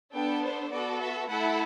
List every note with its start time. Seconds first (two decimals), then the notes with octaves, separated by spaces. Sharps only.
0.13 B3 D4 A4 G5
0.42 C5
0.71 B3 F#4 A4 D5
1.00 E5
1.29 A3 E4 A4 F#5